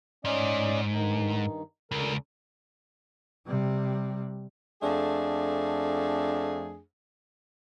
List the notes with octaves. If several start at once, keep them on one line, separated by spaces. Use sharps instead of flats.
G#2 C#4 D5 D#5
G2 D#3 D#4
C#2 D3 A#4
C3 G3
F2 A3 D4 G#4